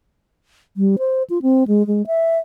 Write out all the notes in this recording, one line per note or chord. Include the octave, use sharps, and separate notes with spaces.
G3
C5
F4
C4
G#3
G#3
E5